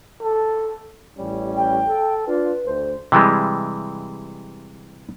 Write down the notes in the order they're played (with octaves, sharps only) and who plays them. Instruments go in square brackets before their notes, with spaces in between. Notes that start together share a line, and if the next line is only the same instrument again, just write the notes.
[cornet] A4
[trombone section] A1 G3 C#4
[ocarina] G5
[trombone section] A4
[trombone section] D4 F4 [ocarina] B4
[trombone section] D2 A3 C5
[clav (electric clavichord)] C3 E3 G3 G#3